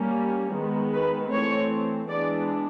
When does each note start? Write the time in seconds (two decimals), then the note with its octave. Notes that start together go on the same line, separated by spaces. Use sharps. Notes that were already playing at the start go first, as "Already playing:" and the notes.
Already playing: G3 A#3 C#4
0.54 D#3 G#3 B3
0.93 B4
1.31 E3 A3 C4 C#5
2.09 E3 G#3 B3 D4 D5